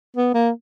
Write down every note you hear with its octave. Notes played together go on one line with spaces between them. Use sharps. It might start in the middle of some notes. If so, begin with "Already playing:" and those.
B3
A#3